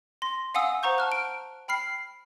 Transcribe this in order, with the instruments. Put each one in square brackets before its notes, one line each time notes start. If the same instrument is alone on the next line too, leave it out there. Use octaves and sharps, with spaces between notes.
[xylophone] C6 A#6
F5 F#5 G#5 D#6 E6
C5 F#5 A#5 C#6 G6
A5 F6 F#6
D7
G5 B5 F6 C7